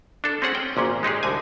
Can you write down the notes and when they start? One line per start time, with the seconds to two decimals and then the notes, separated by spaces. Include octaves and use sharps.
0.24 D4 A4
0.42 C4 C#4 G#4 F#5
0.55 G5
0.77 G#1 A#2 C#4
1.03 G#3 D#4 G4 G#4
1.23 C2 D3 G#5